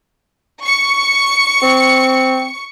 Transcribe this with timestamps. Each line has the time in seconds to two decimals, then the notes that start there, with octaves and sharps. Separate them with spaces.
0.63 C#6 C#7
1.62 C4